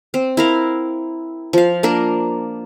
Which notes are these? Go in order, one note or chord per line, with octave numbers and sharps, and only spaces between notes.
C4
E4 A#4 F5
F3 F5
A#3 D4 A#4